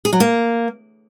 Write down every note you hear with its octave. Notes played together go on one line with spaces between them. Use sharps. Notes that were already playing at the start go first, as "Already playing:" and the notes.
G#4
F#3
A#3